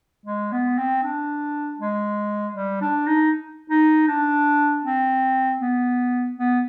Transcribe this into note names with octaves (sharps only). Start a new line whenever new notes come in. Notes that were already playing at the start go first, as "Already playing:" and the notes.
G#3
B3
C4
D4
G#3
G3
D4
D#4
D#4
D4
C4
B3
B3